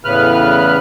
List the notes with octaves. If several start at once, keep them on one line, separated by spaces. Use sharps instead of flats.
E2 A2 C#3 B4 F6 F#6